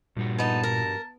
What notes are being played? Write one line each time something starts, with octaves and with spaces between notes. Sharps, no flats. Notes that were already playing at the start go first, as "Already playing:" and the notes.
G2 A#2 G3 F#4
B3 D#4 A5
A#4